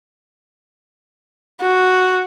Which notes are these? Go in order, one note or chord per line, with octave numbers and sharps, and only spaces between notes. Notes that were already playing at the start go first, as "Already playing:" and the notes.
F#4